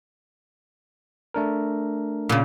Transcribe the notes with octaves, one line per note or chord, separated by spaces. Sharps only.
A3 D4 A#4
A#2 C#3